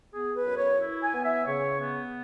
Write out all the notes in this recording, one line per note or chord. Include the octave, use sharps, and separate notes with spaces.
B3 G#4
B4
F#2
C#5
E4
G#5
B3
E5
C#3 C#5
B3